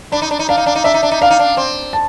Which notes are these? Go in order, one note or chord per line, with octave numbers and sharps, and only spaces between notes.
D4 B5
D#4
D4
D#4
D4 F5
D#4
D4
D#4
D4 E5
D#4
D4
D#4
D4 F5
D#4
D4
C4
A5